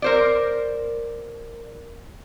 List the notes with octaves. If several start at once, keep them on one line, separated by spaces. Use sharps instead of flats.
A#4 C5 D5